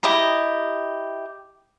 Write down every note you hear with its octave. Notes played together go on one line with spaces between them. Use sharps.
E4 G4 D#5 A#5